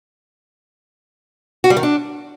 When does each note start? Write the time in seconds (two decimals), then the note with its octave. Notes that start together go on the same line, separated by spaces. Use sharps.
1.64 F#4
1.70 G3
1.77 D#3
1.83 D4